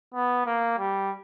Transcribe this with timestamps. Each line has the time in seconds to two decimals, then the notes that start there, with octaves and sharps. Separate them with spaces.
0.14 B3
0.46 A#3
0.78 G3